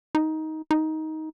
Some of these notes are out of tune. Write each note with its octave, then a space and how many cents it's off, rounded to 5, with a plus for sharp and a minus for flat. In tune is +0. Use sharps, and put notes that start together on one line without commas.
D#4 +15
D#4 +15